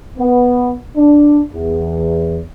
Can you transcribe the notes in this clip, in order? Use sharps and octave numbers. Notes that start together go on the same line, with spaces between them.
B3
D4
E2